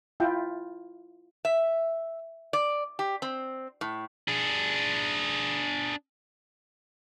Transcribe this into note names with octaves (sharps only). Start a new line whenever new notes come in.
E4 F4 G5
E5
D5
G4
C4
A2
D4 G#4